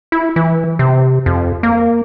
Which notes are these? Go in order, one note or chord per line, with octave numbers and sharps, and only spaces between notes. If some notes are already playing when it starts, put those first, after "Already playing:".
E4
E3
C3
F2
A#3